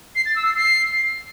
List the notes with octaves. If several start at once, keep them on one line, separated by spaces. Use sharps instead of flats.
C7
A6
E6
C7
C7